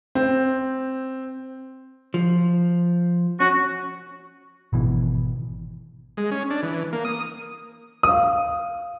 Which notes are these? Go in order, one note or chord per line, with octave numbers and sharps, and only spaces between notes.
C4
F3
C#4 F#4
G#1 B2 E3
G#3
C#4
D4
E3
A#3
D#6
F5 D#6